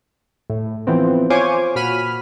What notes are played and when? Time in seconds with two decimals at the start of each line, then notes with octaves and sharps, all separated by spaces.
0.50 A2
0.87 E3 F3 B3 C4
1.30 F4 C5 C#5 G#5 C#6 D6
1.75 A#2 F#4 B5 F6 D#7